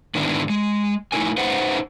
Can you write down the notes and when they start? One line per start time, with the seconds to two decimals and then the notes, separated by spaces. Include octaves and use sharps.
0.15 G#2 D3 D#3 B3 D4 E4
0.49 G#3
1.12 A2 B3 D#4 E4 A#4 G#5
1.38 D#4 B4 C5 E5 F#5